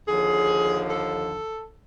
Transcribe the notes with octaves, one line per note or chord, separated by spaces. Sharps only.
D#2 D3 F3 G#4
A4